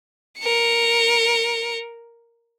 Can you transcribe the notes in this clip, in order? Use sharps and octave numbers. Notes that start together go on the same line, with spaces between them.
A#4 C#7